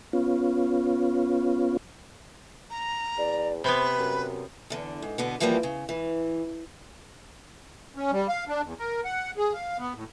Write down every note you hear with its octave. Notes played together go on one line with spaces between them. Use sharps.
B3 C#4 F4
A#5
E2 D5
C3 B3 B4 C5 B5
F#2
E2 D3
G#2
B2 D3 B3
B2 E3 F3 G3 A#3 C4
C#3
E3
C#4
G3
F5
D4
E2
A#4
F#5
G#4
F5
B3
A2